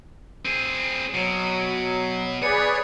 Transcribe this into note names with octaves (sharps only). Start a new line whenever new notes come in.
C4 G#4
B2 F#3
G#4 B4 C#5 D5